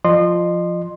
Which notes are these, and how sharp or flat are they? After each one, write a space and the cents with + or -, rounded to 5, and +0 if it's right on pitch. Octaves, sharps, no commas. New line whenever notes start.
F3 +0 D#5 -35 C6 +0